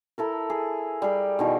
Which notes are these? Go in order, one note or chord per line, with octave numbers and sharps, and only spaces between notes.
E4 A4 A#4
G#4
G3 G#4
B2 D#3 E3